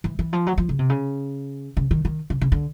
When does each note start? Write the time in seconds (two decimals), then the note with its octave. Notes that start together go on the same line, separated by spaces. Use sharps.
0.04 E3
0.19 E3
0.33 F3
0.47 F#3
0.58 F3
0.69 C#3
0.79 C3
0.90 C#3
1.77 C#3
1.91 D#3
2.05 D#3
2.30 C#3
2.41 C#3
2.52 D3